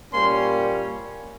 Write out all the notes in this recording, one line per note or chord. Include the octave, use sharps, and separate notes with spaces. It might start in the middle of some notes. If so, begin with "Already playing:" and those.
A#2 G3 A#3 C#4 C5 C6